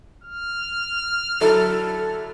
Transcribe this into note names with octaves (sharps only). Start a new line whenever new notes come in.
F6
D3 F#3 E4 A4